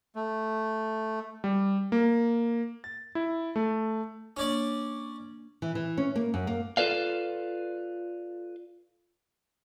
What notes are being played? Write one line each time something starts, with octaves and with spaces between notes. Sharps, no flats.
A3
G3
A#3
A6
E4
A3
A#3 C#4 D4 D5
E3
E3
C#4
A#3
F#2
A#3
F4 A4 B4 D5 F5